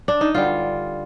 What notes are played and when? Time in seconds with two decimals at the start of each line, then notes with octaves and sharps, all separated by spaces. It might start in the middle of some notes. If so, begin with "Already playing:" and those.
0.08 D4
0.21 D#4
0.34 G2 D3 G3 F4